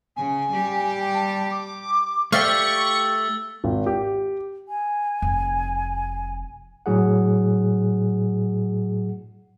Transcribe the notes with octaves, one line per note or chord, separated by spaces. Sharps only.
C#3 G#5
G3 G4
A5
D6
A3 G4 D5 F5 C#6 E6 A6 G7
G#1
G4
G#5
F1
A2 F#3 G#4 F#5